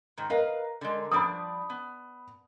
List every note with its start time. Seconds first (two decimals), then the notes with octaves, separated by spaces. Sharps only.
0.17 G#2 D#3
0.30 A#4 B4 D#5 F5
0.81 D3 G#3
1.11 F3 G3 D4 B5 D#6
1.70 B3